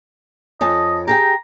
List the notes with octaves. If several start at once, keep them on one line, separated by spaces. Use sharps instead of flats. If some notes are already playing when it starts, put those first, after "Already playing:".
F2 C#4 D#5 A5
G4 G#4 G5 A#5